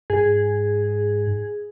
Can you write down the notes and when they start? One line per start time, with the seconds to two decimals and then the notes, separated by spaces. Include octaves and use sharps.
0.10 G#2 G#4